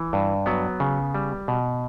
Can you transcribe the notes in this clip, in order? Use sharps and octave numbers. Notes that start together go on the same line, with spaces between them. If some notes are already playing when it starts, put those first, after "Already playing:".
Already playing: E3
G2
F#3 B3
C#3
G3
B2